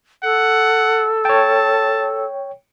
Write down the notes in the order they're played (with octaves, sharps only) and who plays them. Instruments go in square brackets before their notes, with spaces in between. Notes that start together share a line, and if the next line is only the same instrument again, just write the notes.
[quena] A4 [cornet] F#5
[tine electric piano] C#5 G5 [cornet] A5